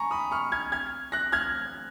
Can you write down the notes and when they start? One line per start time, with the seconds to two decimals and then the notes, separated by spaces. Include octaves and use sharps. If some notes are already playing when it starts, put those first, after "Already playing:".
Already playing: G#5 A#5 B5 C#6
0.11 B5 D#6
0.31 C#6 F6
0.52 F6 G#6
0.72 F6 G#6
1.12 F#6 A#6
1.32 F6 G#6